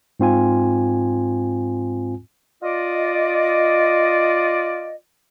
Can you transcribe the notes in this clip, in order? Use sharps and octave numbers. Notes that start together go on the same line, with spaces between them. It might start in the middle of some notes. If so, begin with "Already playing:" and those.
G#2 C4 F4 G#5
F4 D5 D#5